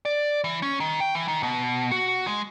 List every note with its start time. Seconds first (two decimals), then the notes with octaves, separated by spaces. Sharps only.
0.05 D5
0.44 E3
0.62 C#4
0.80 D#3
1.00 G5
1.15 E3
1.28 D#3
1.43 B2
1.92 F#4
2.27 G#3